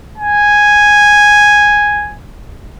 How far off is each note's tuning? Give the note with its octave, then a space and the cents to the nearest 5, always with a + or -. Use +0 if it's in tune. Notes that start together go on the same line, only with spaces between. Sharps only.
G#5 -5